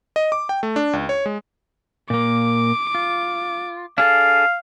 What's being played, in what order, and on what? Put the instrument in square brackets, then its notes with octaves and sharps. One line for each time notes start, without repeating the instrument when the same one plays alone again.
[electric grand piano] D#5
D6
G5
A3
D4
C#2
C#5
G#3
[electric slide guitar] A#2 A#3 [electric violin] D6
[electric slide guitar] F4
[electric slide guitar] D4 G#4 A4 [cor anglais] F5